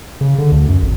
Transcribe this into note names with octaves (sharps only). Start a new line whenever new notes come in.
C#3
D3
D2
F#2
G#1